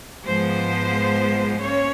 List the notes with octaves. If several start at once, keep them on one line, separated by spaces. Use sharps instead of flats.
G#2 F3 G#3 B3 C5
A#3 C#4 C#5